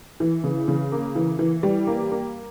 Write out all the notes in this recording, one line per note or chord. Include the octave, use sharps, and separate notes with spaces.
E3
C#3
C#3
A#3
E3
E3
G3
A#3
A#3